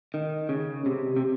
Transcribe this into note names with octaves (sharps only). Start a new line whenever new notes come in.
D#3
C#3
C3
C3